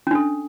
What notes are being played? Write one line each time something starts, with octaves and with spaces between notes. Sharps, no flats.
C#4 D4 A4